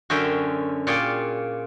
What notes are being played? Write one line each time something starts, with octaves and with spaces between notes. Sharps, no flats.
F#2 D3 C#4 C5 E5 G5
A#2 F4 G#4 C#5 D5 G5